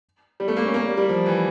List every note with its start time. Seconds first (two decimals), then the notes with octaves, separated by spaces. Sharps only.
0.40 G3
0.48 A3
0.57 A#3
0.65 C#4
0.74 A#3
0.86 G3
0.97 G3
1.09 F3
1.26 E3